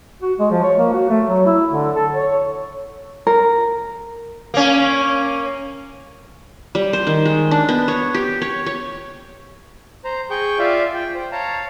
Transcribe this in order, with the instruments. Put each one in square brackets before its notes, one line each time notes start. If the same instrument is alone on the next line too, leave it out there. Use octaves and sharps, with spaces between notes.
[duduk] F#4
G#3
F3
C#5
A#3
F#4
A3
F#3
E4
D3
A4
C#5
[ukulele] A#4
[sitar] A#3 C#4
[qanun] G3
C5
D#3
G#3
D4
B3
C#5
G4
C#5
C#5
[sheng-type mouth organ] C5 A#5
G#4 G5 C#6 G6
F4 D5 E5 F5
G5
C5
C#5 F5 A5 A#5